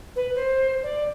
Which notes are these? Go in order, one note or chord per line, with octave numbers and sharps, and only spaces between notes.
B4
C5
D5